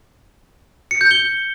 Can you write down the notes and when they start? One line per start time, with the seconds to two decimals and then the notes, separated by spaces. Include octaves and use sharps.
0.91 C#7
1.01 G6
1.11 G7